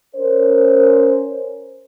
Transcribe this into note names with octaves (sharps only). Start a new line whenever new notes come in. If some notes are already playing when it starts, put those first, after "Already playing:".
C#4 A#4 C5